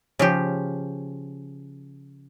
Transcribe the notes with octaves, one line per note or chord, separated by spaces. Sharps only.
C#3 F3 G4